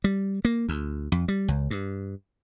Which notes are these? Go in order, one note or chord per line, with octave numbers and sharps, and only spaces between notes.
G3
A#3
D2
F2
G3
C#2
G2